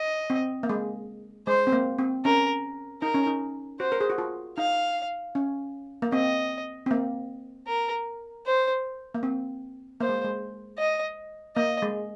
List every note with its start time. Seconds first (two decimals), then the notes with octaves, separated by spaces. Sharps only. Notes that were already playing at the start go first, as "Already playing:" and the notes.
Already playing: D#5
0.30 C4
0.63 A#3
0.69 G#3
1.47 G#3 C5
1.67 C4
1.72 A#3
1.99 C4
2.25 C#4 A#4
3.02 D#4 A#4
3.14 C#4
3.27 D#4
3.80 F#4 C5
3.92 A#4
4.01 G#4
4.10 F#4
4.18 F4
4.58 D#4 F5
5.35 C#4
6.02 A#3
6.12 C4 D#5
6.86 C4
6.91 A#3
7.67 A#4
8.46 C5
9.14 A#3
9.23 C4
10.00 A#3 C5
10.09 G#3
10.24 G#3
10.79 D#5
11.56 A#3 D#5
11.82 G#3